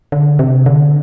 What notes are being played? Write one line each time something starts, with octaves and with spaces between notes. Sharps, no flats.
D3
C3
D3